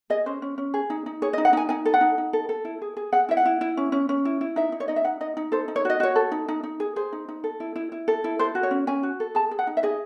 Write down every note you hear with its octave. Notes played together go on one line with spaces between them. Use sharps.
G#4 D#5
C#4 C5
C#4
C#4
G#4
D#4
D#4
G#4 C#5
D#5
D#4
F#5
D#4 G#5
D#4 G#5
A4
F#5
D#4
D#4
A4
A4
E4
G#4
G#4
G#4 F#5
E4 E5
F#5
E4
E4
C#4
C#4
C#4
E4
E4
D#4 E5
D#4
C#5
D#4 D#5
E5
D#4 F#5
D#4 D#5
D#4
A4 C5
D#4
C#5
F#4 D#5
F#4 C#5
A4
D#4
D#4
D#4
G#4
G#4 C5
D#4
D#4
A4
E4
E4
E4
A4
E4
A4 C5
F#4
C#5
C#4
C#4 G#5
F#4
A4
G#4 A5
G#4
F#5
D#4
E5
G#4 D#5